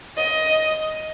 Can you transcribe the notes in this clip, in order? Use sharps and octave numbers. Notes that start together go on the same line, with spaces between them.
D#5